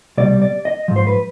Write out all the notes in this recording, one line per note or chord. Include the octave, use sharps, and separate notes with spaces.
C2 B2 G3 D5
D5
D#5
G#2 F3
C5
B4